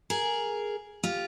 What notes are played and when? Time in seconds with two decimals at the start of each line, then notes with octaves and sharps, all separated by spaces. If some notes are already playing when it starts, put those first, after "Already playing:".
0.10 G#4 A#4
1.03 F4 G4